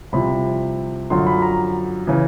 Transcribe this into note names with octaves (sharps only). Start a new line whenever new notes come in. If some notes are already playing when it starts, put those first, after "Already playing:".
C2 C3 F3 B5
F#2 D3 F3 C6
B5
A#5
C#3 E3